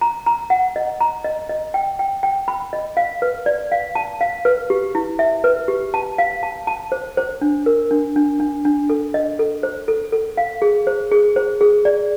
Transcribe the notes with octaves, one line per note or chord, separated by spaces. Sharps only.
A#5
A#5
F#5
D#5
A#5
D#5
D#5
G5
G5
G5
B5
D#5
F5
B4
D5
F5
A5
F5
B4
G4
E4
E5
B4
G4
A5
F5
A5
A5
C5
C5
D4
A#4
D4
D4
D4
D4
A4
D#5
A4
C5
A4
A4
F5
G#4
C5
G#4
C5
G#4
D5